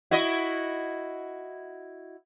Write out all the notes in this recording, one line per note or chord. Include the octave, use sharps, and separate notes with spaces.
E4 F#4 D#5